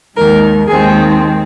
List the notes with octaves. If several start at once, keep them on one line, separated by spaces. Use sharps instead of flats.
D#2 D#3 G#3 A#4
D#2 D#3 G#3 C4 G#4